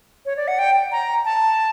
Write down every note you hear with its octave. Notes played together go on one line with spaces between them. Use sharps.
C#5
D5
F#5
G5
A#5
A5